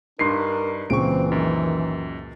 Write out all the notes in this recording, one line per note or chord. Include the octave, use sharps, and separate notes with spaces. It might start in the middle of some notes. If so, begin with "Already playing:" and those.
G2 D4 D#4 A#4 C6 C7
C#2 A#2 C#3 E3 C4 C#6 D7
F#2 D#3